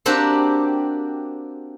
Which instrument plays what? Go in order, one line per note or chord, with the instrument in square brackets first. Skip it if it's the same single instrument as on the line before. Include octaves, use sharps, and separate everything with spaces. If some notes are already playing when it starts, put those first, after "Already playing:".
[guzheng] A#3 C4 D4 F#4 G4